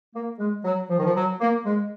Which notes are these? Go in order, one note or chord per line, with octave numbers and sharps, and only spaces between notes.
A#3
G#3
F#3
F3
D#3
F3
F#3
A#3
G#3